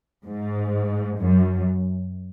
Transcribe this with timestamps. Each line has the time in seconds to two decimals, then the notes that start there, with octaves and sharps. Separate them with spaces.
0.25 G#2
1.19 F#2